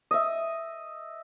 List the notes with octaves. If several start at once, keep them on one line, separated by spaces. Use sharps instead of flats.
D#5 E5